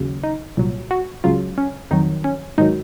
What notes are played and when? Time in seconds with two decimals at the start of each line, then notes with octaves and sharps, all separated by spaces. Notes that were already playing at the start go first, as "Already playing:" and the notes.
Already playing: D#2 C#3 F#3
0.24 D#4
0.57 C2 A#2 F#3
0.91 F#4
1.24 C#2 C#3 F#3 F4
1.58 C#4
1.91 F2 D#3 F#3 D#4
2.24 C#4
2.58 G#2 D#3 F#3 D#4